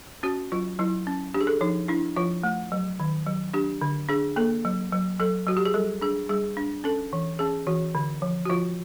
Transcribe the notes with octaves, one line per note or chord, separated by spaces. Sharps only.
C#4 F#4
F#3 F4
F#3 E4
C#4
D4 G4
G#4
A4
F3 D#4
D4 E4
F3 F4
A3
F#3
D#3
F#3
D4 G4
D3
D4 G#4
A#3 A4
F#3
F#3
F#3 A4
F#3 F#4
G4
G#4
G3 A4
D4 G#4
G3 G#4
D4
C#4 A4
E3
C#4 G#4
E3 F#4
D3
F3
F#4
F3 F4